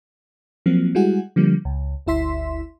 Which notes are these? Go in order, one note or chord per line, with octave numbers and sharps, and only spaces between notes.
F3 F#3 A#3 C4
G3 G#3 E4 F#4 G#4 F#5
D3 F3 G3 A#3
C#2
G1 D2 E4 E5 C6 B6